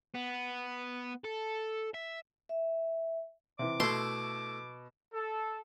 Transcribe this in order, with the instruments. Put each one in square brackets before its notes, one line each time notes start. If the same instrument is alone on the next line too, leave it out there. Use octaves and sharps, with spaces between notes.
[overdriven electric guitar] B3
A4
E5
[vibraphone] E5
[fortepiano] C3 E3 [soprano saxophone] D6
[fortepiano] B2 [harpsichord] A3 E4 [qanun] C6
[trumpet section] A4